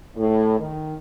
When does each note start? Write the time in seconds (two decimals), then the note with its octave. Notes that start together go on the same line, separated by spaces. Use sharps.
0.17 A2
0.59 D#3